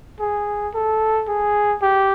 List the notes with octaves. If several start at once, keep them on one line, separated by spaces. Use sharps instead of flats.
G#4
A4
G#4
G4